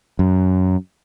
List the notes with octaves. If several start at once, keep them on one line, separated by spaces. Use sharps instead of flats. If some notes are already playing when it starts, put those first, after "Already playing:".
F#2